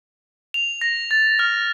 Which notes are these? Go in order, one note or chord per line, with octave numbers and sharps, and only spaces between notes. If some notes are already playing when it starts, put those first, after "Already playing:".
F7
A#6
A6
F6